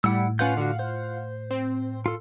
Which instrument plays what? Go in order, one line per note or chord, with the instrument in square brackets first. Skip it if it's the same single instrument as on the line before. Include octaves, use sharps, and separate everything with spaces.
[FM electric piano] A2 [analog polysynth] G3 [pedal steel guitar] E4 F#5 E6
[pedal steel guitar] C#4 B4 G6 [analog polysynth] F4 F5 F#5
[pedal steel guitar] D3 F#4
C5
[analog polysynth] C4
[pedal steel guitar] F4 A4